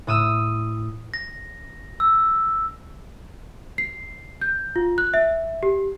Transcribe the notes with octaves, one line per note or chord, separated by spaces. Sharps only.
A2 D#6 E6
A#6
E6
C7
G6
F4
F#6
E5
G4